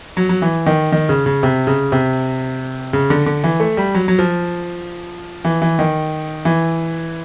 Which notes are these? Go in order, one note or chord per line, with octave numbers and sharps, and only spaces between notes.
F#3
F#3
E3
D#3
D#3
C#3
C#3
C3
C#3
C3
C#3
D3
D3
E3
A3
G3
F#3
F#3
F3
E3
E3
D#3
E3